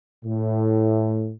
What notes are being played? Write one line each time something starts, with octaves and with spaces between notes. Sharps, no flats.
A2